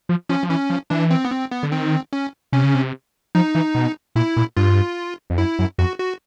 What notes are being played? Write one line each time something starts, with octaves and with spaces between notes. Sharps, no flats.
F3
F3 C#4
F3
E3 C#4
F3
E3 D4
C4
B3
C4
B3
D3
D#3 C4
C#4
C3 C#4
C#3
C3
F3 D#4
E3
B2
A#2 E4
A#2
G2 F4
F2
F#2 E4
F#2
F2 F#4
F#4